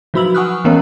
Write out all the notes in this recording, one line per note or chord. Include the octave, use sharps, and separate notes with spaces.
F3 F#3 F#4 B5 E6 F#7
F#5 G#5 C#6 D#6 F6 F#6
E3 G#3 B3 C#4 A#4 C#5